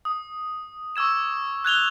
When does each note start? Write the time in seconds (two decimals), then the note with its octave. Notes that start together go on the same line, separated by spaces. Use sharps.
0.05 D#6
0.96 C#6 D6 E6 G#6 E7
1.65 F#6 G#6 F7 G7